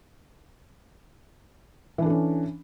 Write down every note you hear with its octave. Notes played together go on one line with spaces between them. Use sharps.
E3 C#4 D4 A4